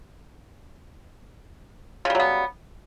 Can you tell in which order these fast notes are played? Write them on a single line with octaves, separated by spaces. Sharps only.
C#3 G3 F#3 B3